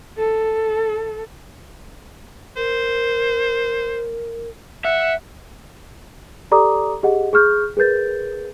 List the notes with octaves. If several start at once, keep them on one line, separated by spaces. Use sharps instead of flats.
A4
A#4 C5
E5 F#5
G4 A4 D5 A#5 D6 D#6
G4 G#4 D#5 F#5
G#4 C#6 F6 G6
G#4 A#4 B4 G6 A6